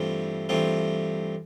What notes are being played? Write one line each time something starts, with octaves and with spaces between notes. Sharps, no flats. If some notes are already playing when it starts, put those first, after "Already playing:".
Already playing: G2 E3 A3 C4 F4
G2 E3 A3 C4 F4